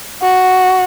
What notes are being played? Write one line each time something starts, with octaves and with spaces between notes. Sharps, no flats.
F#4